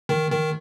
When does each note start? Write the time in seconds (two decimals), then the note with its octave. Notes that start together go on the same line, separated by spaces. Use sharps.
0.09 D#3
0.31 D#3